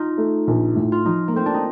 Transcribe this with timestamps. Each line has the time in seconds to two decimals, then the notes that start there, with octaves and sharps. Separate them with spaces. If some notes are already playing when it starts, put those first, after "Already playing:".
Already playing: D#4 F4
0.18 A3
0.47 A#1
0.75 A2
0.92 F4
1.05 F3 D#4
1.28 A#3
1.34 A3 C4
1.46 D4
1.54 D#4